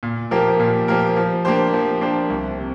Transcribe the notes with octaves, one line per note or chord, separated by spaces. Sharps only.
A#2
F3 A#3 G4 A#4
A#2
F3 A#3 G4 A#4
F3
A#3 D4 G4 C5
F3
A#3 D4 G4 C5
C2
C3